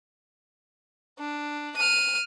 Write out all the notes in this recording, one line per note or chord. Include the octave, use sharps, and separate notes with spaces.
D4
F6 D#7